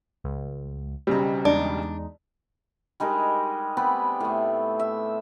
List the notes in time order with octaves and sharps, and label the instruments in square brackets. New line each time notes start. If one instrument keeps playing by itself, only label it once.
[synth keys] C#2
[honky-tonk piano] B1 C#3 G3 [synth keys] C4 A#5
[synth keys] E2 G#3 D#4 [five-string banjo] D4
[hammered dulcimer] G3 G#3 D#4 A#4
B3 C4 D5 B5
A2 A3
E5